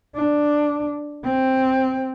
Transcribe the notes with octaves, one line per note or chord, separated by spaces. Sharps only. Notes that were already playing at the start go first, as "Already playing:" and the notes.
D4
C4